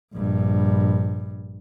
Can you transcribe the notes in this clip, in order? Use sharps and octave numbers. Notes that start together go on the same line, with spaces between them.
A#1 G2